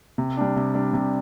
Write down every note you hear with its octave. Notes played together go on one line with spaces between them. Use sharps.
C3
G3 D4
C3
G3 D4
C3